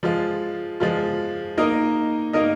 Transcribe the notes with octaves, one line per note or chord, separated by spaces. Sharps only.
F3 G#3 F4
F3 G#3 F4
A#3 D#4 A#4 D#5
A#3 D#4 A#4 D#5